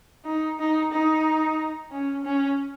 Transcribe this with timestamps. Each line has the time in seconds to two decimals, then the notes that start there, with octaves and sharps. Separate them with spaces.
0.25 D#4
0.59 D#4
0.92 D#4
1.91 C#4
2.24 C#4